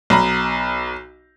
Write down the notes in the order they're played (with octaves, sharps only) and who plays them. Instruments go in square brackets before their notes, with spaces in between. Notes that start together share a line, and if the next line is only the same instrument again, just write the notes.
[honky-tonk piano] B1 A#5 B5